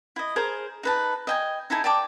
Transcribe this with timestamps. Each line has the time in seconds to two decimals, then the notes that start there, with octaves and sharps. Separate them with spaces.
0.16 E4 D#5
0.36 G#4 A#4 C5
0.83 D#4 B4 A5
1.27 D#5 G5 G#5
1.70 D#4 E4 A4 G#5
1.84 D5 G5 A5 D6